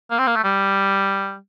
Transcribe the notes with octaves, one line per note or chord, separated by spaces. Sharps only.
A#3
C4
A#3
A3
G3